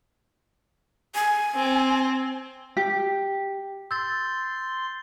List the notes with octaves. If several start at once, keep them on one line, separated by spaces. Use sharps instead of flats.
G#5
C4
G4
C6 E6 G6 A6